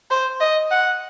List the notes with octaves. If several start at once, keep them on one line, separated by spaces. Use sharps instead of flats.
C5
D#5
F#5